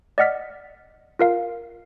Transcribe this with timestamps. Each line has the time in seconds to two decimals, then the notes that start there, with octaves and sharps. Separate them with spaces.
0.18 D5 D#5 F#5 F6 B6
1.19 F4 A#4 F5